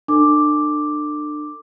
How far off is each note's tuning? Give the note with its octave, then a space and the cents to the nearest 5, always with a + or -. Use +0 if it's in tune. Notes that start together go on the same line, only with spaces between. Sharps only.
D4 +35 A4 +30 D6 +0